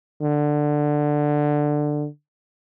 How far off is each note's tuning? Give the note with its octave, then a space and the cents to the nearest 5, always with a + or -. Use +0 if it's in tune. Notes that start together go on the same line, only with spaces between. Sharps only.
D3 +10